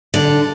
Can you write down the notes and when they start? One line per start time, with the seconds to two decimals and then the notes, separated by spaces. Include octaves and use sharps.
0.14 D3